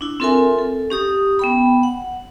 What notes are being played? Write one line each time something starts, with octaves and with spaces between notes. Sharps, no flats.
D4 E4
C4 F4 A4 A#4 E5 G#5
A4
C#4 G4 D#6
B3 G5 B5
F#5